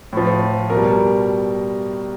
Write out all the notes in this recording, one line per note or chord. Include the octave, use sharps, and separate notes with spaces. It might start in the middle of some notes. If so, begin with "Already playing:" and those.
A2 F3
B2 G3 A#4